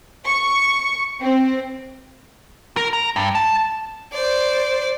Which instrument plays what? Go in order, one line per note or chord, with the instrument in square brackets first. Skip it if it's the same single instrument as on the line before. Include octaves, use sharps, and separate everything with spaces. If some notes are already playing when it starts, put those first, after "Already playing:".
[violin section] C#6
C4
[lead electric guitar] A#4
A#5
G2
A5
[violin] C5 D5